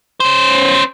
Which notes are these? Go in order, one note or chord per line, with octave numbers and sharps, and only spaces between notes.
C#4 C5